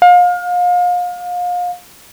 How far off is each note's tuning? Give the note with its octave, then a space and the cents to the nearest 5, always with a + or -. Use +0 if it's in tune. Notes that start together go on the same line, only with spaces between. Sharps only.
F5 +30